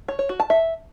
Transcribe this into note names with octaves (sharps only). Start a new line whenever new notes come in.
C#5
C#5
F#4
A5
E5